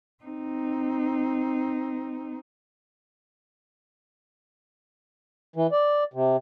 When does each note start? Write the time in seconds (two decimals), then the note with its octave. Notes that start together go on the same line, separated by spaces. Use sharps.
0.24 C4 D#4
5.56 E3
5.72 D5
6.14 C3